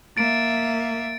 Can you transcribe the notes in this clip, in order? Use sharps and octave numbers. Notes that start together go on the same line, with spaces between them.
A#3 E5 A6 D7